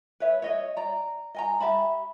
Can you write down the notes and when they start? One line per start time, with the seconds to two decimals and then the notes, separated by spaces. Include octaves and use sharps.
0.20 B4 C#5 E5
0.42 C#5 D#5 E5
0.77 D5 A#5
1.34 D#5 G#5 A#5
1.60 G4 E5 A5 B5